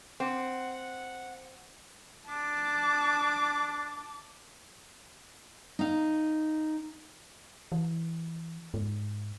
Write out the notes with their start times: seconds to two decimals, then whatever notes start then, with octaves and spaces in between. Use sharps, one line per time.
0.20 C4 F#5
2.29 D4 A5 D6
5.79 D#4 F5
7.72 E3
8.74 G#2